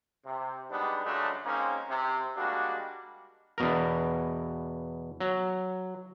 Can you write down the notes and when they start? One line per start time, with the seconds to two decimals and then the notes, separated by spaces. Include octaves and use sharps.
0.25 C3
0.70 G3 G#3 B3 D4 D#4
1.04 F#2 C#3 G#3 A3 D4
1.45 G#3 A#3 C4 C#4 D#4
1.89 C3
2.36 G3 G#3 A#3 D4 F#4
3.58 E2 B2 A#4
5.20 F#3